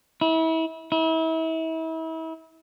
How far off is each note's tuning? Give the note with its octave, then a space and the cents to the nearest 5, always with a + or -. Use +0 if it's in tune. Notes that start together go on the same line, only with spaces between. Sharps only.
E4 -30
E4 -35